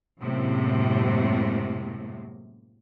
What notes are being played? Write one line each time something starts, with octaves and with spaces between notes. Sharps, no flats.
F#2 A2 C3 G#3 A#3